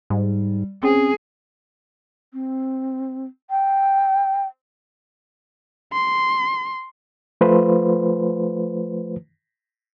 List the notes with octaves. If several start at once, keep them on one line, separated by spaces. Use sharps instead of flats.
G#2 G3
C4 C#4 G#4
C4
G5
C6
F3 A3 F4 B4 C5